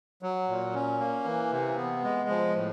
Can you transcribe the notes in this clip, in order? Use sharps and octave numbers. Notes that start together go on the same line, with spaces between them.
F#3
A#2
C#4
A#3
E3
C3
B3
G#3
F3
A2